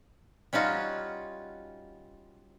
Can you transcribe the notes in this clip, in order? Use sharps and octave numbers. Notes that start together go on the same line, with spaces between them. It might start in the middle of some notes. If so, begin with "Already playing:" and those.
G3 C#4 D#4 F4 F#4